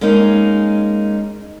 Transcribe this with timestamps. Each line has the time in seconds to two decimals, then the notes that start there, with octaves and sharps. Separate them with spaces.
0.01 G#3 A#3 C#4 D#4